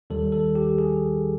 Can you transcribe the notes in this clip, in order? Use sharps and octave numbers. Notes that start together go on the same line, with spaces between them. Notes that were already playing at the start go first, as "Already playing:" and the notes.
D#2 D#3 G3 A4
A4
G4
G#4